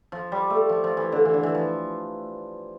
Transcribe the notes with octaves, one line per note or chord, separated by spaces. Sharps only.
F3
G3
A3
F3
F3
E3
D3
E3
D3
E3
F3